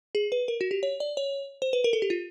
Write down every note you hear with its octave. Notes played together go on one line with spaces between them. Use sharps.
G#4
B4
A#4
F#4
G4
C#5
D5
C#5
C5
B4
A#4
A4
G4
F4